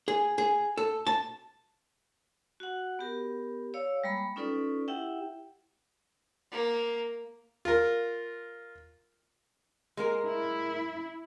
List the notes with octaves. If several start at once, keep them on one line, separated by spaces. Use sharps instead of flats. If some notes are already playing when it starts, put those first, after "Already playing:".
G#4
G#4
A4
A5
F#4 F#5
B3 G4 A#4
C#5 D5 F5 E6
G3 G#3 A#3 B5
C#4 D#4 F4 A4 B4 D5
E4 G4 E5 F#5 G5
A#3
F4 A#4
G#3 A#3 A#4
E4